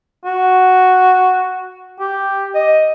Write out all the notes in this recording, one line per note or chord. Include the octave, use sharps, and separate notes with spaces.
F#4
G4
D#5